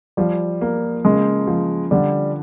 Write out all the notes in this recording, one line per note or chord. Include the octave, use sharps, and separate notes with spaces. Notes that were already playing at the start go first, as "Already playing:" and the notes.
F3 G3
A#3
C#3 G#3
F3
D3 G3